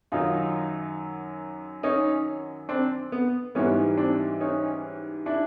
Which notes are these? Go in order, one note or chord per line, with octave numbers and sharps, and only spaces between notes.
F#2 D#3 F#3 D#4 F4
C#4 D#4
C4 D4
B3
G#2 E3 G3 B3 C#4
C4 D4
C#4 D#4
D4 E4